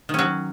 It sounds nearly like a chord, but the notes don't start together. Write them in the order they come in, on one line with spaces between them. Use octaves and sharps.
D#3 C#4 F#3